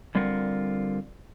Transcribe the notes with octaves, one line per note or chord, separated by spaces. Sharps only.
D3 G3 C4 F4 A#4 F#5